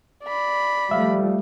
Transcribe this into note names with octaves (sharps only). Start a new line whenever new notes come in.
D5 B5
F3 G3 A3 E5 F5